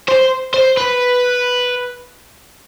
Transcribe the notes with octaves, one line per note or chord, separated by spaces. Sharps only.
C5
C5
B4